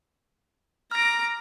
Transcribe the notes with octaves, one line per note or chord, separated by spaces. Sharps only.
A#5 D6 F6 A#6